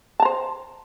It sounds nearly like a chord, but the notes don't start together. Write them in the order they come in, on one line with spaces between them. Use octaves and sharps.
A5 A#5 C5